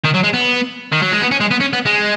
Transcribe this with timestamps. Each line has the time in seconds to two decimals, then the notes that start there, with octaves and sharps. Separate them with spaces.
0.05 D#3
0.15 F#3
0.24 G#3
0.34 B3
0.92 D#3
1.02 F#3
1.12 G#3
1.21 B3
1.31 C#4
1.40 G#3
1.51 B3
1.60 C#4
1.73 B3
1.86 G#3